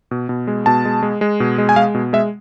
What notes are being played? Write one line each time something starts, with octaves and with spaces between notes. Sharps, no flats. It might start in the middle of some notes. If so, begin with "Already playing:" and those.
B2
B2
G#3
B2 A5
G#3
G#3
G#3
B2
G#3
G#5
G#3 F5
B2
G#3 E5